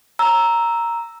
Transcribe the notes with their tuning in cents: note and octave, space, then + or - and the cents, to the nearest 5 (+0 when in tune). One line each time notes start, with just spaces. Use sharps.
A#5 +0 E6 +0